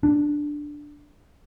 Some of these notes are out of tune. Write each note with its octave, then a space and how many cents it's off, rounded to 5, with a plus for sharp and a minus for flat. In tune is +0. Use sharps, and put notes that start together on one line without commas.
D4 +5